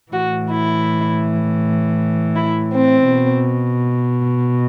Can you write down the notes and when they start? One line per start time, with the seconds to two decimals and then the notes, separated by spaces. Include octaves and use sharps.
0.12 A2 E3 F#4
0.49 E4
2.35 E4
2.73 C4
3.10 B2